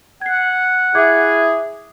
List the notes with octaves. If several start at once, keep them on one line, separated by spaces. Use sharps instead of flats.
F#5 G#6 C7
E4 G#4 E5 D6 G#6